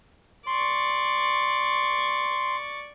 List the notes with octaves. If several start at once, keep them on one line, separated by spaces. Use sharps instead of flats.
D5 C6 C#6